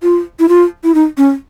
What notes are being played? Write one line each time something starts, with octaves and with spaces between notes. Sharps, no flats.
F4
E4
F4
E4
D#4
C#4